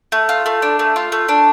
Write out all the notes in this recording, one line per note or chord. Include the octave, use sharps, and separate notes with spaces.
A3
F4
A3
D4
A3
F4
A3
D4